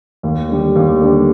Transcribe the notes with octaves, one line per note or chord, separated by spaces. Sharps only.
D#2
D3 G3
D#2
D3 G3